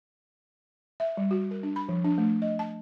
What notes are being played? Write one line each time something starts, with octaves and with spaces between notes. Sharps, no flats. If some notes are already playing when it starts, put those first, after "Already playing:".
E5
G3
F#4
A#4
D4
B5
F3
D4
A3
D#5
A5